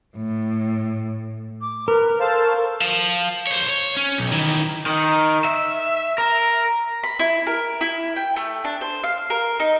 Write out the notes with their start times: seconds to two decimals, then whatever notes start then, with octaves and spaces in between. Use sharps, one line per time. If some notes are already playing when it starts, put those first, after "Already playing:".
0.16 A2
1.61 D6
1.88 A#4 B4
2.20 A4 C5 F5 A5
2.46 C#6
2.81 F5 A5
3.47 C5 C#5
3.69 C#5
3.97 C#4
4.18 B1
4.31 D#3 E3
4.86 D#3
5.45 E5
6.18 A#4
7.03 B5
7.19 E4
7.47 A#4
7.81 E4
8.16 G5
8.36 A3
8.65 D4
8.81 C5
9.04 F5
9.30 A#4
9.60 D#4